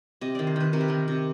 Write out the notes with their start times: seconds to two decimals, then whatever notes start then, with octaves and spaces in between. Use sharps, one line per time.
0.21 C3 D#5
0.35 D#3 D5
0.47 C5
0.56 D#3 B4
0.73 C3 A#4
0.81 B4
0.88 D#3 A#4
1.08 C3